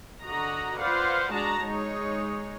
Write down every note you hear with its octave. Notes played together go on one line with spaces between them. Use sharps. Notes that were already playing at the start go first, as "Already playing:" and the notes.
D3 F#4 D#5 A#5
F4 B4 C5 D5 F5 F#5
G#3 D4 F#4 A5 A#5
G#3 D#4 C#5